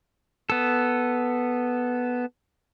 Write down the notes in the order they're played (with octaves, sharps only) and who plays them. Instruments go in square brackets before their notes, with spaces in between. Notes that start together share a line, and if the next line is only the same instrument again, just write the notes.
[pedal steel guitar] B3 A4